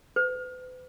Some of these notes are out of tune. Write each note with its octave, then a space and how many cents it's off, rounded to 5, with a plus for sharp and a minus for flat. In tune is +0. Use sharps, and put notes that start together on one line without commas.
B4 +45